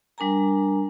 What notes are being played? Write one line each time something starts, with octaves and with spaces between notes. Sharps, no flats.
G3 D4 A#4 G#5 A#5